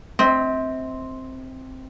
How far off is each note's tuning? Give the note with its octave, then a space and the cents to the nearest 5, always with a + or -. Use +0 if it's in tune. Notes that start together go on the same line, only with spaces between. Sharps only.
C4 +0 E5 -40 E6 +0